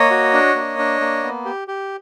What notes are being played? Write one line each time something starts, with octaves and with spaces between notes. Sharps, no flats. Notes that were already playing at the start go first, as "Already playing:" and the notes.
Already playing: A#3 C#5 D#5
F#4
D4
A#3
D4
A#3
B3
G4
G4